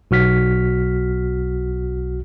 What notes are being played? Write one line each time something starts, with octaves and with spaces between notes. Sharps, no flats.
B1 F#4 F6 B6